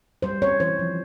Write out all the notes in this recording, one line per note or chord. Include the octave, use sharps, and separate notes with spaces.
G3 C5
C4 C#5
E3 C5
F3